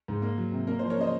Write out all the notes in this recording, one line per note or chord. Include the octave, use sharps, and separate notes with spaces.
G#2
A#3
F#3
C3
A#3 A#4
C5
F3
A#4 C#5
C#3 C5 D#5